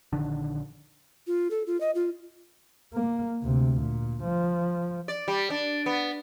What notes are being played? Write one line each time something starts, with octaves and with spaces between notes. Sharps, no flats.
A#1 D3 D#3 D4
F4
A4
F4
D#5
F4
A#3
D2 C3
A#2
F3
D5
G3
D4
B3